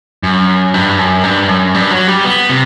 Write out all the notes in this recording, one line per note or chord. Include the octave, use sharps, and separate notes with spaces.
F#2
G2
F#2
G2
F#2
G2
F#3
G3
B3
C3